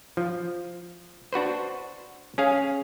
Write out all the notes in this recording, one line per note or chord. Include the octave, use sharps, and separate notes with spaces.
F3
D4 F#4 B4 C5
C#4 G#4 F5